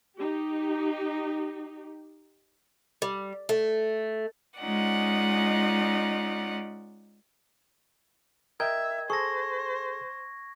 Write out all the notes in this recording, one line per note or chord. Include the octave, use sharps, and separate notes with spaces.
D#4 G4
G3
A3
G#3 C#4 D#4 F4 D5 F#5
A#4 D#5 E5 G5 G#6
G#4 A4 C5 C#6 A#6